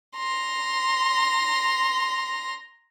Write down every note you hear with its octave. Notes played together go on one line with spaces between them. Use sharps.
A#5 C6